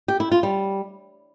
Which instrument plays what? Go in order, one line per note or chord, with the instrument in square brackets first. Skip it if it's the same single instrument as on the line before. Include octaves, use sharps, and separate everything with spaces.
[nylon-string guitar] G4
E4
F4
G3